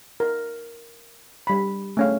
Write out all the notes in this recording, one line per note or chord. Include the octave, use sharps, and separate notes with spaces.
A#4
G3 B5
A3 C#4 F5